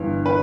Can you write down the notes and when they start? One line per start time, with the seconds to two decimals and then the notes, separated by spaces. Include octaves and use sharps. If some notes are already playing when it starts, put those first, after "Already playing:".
Already playing: G1 G2 E3 B3
0.26 B4